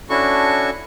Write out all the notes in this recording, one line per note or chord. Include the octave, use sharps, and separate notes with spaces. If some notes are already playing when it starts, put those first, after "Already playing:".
C#4 D4 E4 F#4 A4 C#6